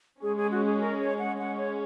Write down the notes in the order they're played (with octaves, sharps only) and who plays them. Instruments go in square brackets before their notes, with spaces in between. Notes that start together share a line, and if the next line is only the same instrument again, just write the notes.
[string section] G#3 C#4 [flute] G#4
[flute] G#4
F#4
G#4
A#4
C#5
F#5
[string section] G#3 C#4 [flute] F#5
[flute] C#5